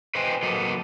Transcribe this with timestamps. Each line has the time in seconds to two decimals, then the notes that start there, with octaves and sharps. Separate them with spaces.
0.15 B4 C5 D#5 G5 G#5
0.43 F#3 A#3 A4 B4 D#5